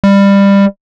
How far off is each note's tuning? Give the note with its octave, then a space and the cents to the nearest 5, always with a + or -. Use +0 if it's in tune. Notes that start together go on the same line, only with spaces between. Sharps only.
G3 +20